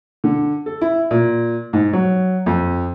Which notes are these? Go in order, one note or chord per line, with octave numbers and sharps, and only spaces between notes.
D3
A4
E4
A#2
G#2
F#3
F2